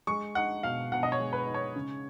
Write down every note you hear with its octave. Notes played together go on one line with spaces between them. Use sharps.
G#3 C#6
D#4 F#5
B2 F5
B2 F#5
D#5
C#5
G#3
B4
D#4
C#5
C#3